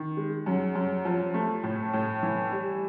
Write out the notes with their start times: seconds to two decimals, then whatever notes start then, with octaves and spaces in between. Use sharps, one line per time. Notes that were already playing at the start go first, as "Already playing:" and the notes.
Already playing: D#3
0.17 G#3
0.46 F#2
0.75 F#2
1.05 F3
1.34 A3
1.63 A2
1.93 A2
2.22 E3
2.52 G3